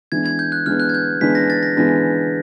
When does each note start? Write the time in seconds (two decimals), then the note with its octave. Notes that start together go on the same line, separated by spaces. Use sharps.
0.12 E3 G#3 B3 D4 G#6
0.26 G#6
0.39 G6
0.52 F#6
0.66 E3 G#3 B3 D4 F6
0.80 F#6
0.89 G#6
0.94 G6
1.21 E3 G#3 B3 D4 B6
1.35 A#6
1.50 A6
1.63 A#6
1.76 E3 G#3 B3 D4 A#6